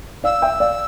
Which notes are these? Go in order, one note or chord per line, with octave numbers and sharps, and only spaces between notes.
D5 F5 E6
E5 G5
D5 F5